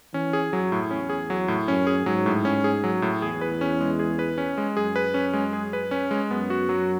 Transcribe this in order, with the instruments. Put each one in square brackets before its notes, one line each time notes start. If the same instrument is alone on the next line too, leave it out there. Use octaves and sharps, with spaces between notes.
[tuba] E3 [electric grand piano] C#4
[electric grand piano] G#4
[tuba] F#2 [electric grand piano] F#3
[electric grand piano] A2
[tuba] E2 [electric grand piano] C#4
[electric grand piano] G#4
F#3
A2
[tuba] F#2 [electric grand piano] C#4
[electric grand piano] G#4
[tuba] G#2 [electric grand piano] F#3
[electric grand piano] A2
C#4
G#4
F#3
A2
[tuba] E2 [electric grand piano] G#4
[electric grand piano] B4
C#4
G#3
G#4
B4
C#4
G#3
[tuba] F#2 [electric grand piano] G#4
[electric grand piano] B4
C#4
G#3
G#4
B4
C#4
G#3
[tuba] F#2 [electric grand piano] B3
[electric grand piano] F#4
F#3